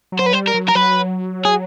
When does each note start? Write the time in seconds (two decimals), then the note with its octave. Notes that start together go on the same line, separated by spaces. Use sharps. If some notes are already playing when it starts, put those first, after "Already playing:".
0.12 F#3
0.19 C5
0.26 B4
0.33 G3 C5
0.48 A#4
0.54 F#3
0.68 A#4
0.75 F#3 B4
1.45 G#4